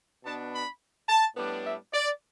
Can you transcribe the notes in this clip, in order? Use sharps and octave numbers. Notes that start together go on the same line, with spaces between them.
B2 B3 D4 A5
B5
A5
A2 G3 B3 D4
E5
D5